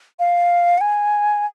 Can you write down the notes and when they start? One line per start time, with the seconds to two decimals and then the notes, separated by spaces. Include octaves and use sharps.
0.19 F5
0.78 F#5
0.81 G#5